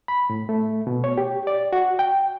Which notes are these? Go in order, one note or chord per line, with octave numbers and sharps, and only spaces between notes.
B5
A2
A3
B2
C#5
G4
D5
F#4
G5